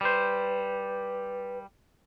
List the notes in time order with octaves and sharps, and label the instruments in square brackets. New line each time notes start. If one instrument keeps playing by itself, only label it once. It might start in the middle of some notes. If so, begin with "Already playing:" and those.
[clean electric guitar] G3 C5 [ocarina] B4